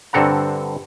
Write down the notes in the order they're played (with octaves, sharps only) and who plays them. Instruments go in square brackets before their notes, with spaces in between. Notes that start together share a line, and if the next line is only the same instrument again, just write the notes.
[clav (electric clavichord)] G2 D3 C4 A4 F#5 A#5